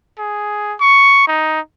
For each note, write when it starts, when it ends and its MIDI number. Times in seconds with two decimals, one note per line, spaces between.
0.19 0.74 68
0.81 1.26 85
1.28 1.60 63